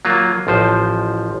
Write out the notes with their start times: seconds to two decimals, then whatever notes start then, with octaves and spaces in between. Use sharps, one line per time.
0.05 F#3 A#3 F4
0.47 A1 F3 C5